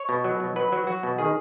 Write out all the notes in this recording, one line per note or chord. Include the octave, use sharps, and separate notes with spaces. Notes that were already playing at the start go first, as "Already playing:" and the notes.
Already playing: C#5
B2
F#3
B2
F#3 B4
F#3
F#3 F#4
B2
D#3 G#4